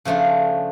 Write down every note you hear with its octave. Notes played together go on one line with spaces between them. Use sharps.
C#3 F3 A3 D4 F4